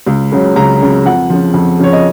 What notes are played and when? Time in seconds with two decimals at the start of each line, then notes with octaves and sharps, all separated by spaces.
0.06 C#2
0.32 C#3 F#3
0.56 C#2 A#5
0.81 C#3 F#3
1.06 F2 F#5
1.30 C#3 F3
1.54 F2
1.79 C#3 F3 C#5
1.93 D#5